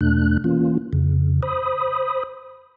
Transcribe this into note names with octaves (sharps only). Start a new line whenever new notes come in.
E2 B2 A3 D4 F#6
E3 A#3 C#4 F4
F2 C#3
C5 B5 D#6